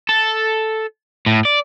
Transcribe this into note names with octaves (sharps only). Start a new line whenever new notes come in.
A4
A2
D5